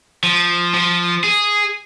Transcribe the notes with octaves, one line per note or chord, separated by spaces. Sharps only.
F3
F3
G#4